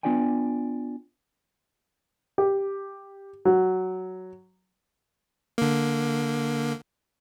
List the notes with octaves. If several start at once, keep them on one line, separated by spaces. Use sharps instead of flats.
B3 D4 F4 D5 G5 G#5
G4
F#3
D3 A#3